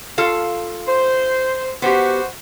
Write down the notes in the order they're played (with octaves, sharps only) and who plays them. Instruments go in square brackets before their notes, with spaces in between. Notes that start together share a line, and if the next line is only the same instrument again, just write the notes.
[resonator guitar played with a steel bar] F4 A4 F5
[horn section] C5
[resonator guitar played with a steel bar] B3 G4 [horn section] F#4 C5